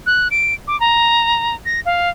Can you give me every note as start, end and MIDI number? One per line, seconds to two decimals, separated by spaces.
0.06 0.28 90
0.31 0.54 98
0.67 0.79 86
0.80 1.55 82
1.65 1.80 94
1.86 2.10 77